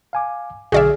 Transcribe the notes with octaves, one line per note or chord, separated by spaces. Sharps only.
F5 G#5 D6
B1 D3 F#4 G#4 D5 E5 F6